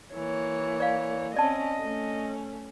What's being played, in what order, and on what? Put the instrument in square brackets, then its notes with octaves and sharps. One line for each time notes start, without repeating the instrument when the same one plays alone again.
[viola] E3 A#3 [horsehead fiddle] C#5
[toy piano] D5 F5
[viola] C4 C#4 [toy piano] D5 A5 [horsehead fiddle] D#5
[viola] A3 C#4